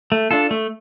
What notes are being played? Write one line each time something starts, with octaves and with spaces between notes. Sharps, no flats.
A3
D4 F4 A4
A3